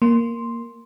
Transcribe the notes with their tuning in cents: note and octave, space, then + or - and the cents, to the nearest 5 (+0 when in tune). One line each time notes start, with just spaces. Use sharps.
A#3 +0 C6 +0